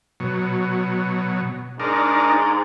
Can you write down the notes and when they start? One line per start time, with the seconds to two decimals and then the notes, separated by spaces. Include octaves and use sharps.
0.20 B2 F#3
1.80 G#2 D4 D#4 A#4